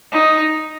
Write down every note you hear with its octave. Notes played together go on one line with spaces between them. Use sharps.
D#4